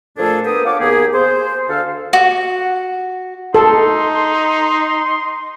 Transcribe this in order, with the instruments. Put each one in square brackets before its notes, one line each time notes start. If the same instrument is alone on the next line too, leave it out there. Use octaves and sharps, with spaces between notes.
[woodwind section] A#2 F3 A3 D4 G#4 A4
A#3 B3 D4 G4 D#6
C#5 F5 F#5 D6
D#2 A#3 B3 G4 G#4
G#4 C5
D2 A4 F5
[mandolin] F#4
[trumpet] D#4 [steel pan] A4 [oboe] C6